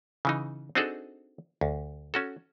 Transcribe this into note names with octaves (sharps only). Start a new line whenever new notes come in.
C#3 E3 D#4
C4 D4 D#4 F#4 G#4 A4
D2
C#4 F#4 A4